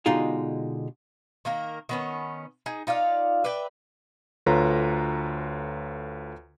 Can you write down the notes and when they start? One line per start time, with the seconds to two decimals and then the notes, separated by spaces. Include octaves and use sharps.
0.06 B2 D3 G#3 D#4 F4 G#4
1.45 D#3 A#3 A#4
1.89 D#3 B3 C#4
2.66 D#4 G#4
2.87 D#4 F4 D5 F5
3.44 B4 D5 E5 G5
4.46 D2 F4 A4 B4 C#5 A#5